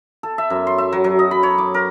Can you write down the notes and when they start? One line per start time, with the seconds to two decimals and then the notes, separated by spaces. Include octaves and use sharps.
0.23 A4
0.38 E5
0.50 F#2
0.67 C6
0.78 E5
0.93 F#3
1.04 F#3
1.19 D#5
1.31 B5
1.43 C#5
1.58 D6
1.74 A#4